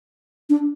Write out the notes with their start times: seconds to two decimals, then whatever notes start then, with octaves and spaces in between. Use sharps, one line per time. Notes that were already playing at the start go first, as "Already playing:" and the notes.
0.50 D4